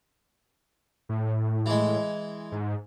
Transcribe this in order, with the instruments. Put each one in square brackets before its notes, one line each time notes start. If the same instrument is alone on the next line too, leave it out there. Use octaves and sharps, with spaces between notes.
[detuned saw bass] A2
[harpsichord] E3 G#3
[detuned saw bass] G#2